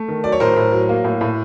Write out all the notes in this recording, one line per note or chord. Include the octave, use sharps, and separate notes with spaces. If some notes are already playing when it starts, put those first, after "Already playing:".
Already playing: A3
D#3
F#3 D5
C#5
A2 A#4 C5
A2
F#3
A#3
A2
A2